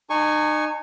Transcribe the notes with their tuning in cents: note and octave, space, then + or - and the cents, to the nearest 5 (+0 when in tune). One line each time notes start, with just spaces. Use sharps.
D#4 -35 G#5 +0 C#6 +0